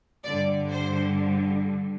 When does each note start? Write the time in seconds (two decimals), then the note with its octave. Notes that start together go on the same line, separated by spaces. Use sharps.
0.24 G2 D3 D5
0.69 C5